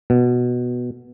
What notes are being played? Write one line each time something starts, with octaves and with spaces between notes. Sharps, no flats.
B2